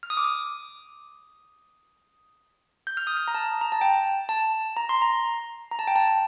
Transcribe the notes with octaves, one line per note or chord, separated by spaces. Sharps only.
F6
D#6
D6
D#6
G6
F6
D#6
F6
A#5
A5
A#5
A5
G5
A5
A#5
C6
A#5
A#5
A5
G5
A5